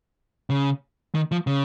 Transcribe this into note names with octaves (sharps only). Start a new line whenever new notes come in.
C#3
D#3
F3
C#3